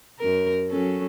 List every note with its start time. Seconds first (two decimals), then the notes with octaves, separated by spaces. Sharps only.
0.20 F#2 A#4
0.69 F#3 C#4 A4